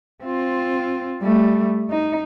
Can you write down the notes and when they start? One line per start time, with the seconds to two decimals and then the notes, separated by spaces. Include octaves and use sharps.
0.24 C4 F4
1.23 G3 A3
1.90 D#4